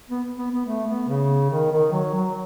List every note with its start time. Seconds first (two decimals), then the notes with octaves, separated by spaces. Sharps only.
0.10 B3
0.38 B3
0.52 B3
0.66 A3
0.87 B3
1.08 C#3
1.50 D#3
1.72 D#3
1.92 F#3
2.14 F#3